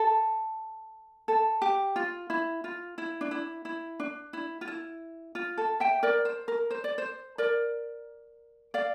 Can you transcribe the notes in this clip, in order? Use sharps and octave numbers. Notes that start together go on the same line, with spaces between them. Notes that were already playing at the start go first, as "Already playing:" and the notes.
Already playing: A4
A4
G4
F4
E4
F4
E4
D4
E4
E4
D4
E4
F4
E4
F4
A4
E5 G5
A#4 D5
C5
A#4
C5
D5
C5
A#4 D5
D5 F5